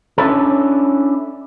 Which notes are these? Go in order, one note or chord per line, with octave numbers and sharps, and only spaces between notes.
C#4 D4 E4 A4